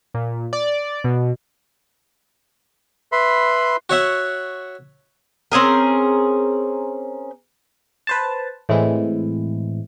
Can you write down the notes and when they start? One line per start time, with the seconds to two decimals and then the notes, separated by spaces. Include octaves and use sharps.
0.14 A#2
0.53 D5
1.04 B2
3.12 B4 E5 B5 C6
3.90 F#4 C#5 E5 F#5
5.52 C4 C#4 G#4 A#4
8.07 B4 C5 A5
8.69 A2 E3 G#3 C4 E4